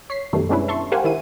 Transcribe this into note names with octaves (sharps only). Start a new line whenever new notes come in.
C#5 B6 C7
F#2 B2 D#3 G3 A3
G#3 B3 C#4 D4 E4 B4
E5 A5 C6 C#6
G4 A#4 C5 F5 F#5 G#5
D#3 E4 D#7